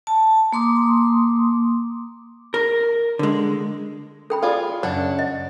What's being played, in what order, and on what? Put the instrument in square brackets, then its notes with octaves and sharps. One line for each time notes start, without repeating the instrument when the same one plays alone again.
[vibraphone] A5
A#3 C6 D6 D#6
[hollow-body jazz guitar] A#4
D3 G#3
[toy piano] A4 G5 B5
[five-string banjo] F4 G#4 D5
[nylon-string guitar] F#2 C#3 F#5 [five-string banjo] D4 [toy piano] D5
[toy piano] D#5